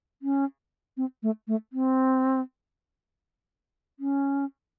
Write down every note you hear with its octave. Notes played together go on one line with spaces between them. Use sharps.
C#4
C4
A3
A3
C4
C#4